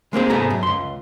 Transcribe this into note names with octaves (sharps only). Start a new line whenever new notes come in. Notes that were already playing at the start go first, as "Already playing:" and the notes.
G#3 A#3 C4 G#4
C2 G#2 A3 B3 G#4 A#5
F#2
C#2 C6